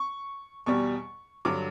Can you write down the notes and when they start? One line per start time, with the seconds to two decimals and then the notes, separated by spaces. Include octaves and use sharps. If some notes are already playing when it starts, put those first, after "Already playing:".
Already playing: C#6
0.66 E2 B2 G3 C#6
1.45 G2 D3 F#3 D6